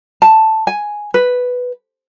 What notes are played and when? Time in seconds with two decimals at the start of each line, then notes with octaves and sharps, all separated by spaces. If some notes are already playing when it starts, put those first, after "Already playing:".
0.22 A5
0.67 G#5
1.14 B4